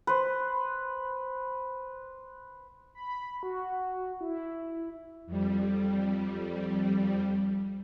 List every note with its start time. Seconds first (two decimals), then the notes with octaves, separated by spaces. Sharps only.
0.07 B4 C5
2.95 B5
3.43 F#4
4.21 E4
5.27 F2 G3